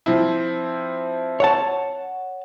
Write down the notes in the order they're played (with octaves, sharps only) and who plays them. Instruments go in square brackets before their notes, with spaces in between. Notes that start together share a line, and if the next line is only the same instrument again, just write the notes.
[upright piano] F3 C4 E4
[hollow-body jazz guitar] C#5 F#5 A5